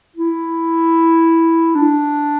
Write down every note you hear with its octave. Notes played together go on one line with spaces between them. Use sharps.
E4
D4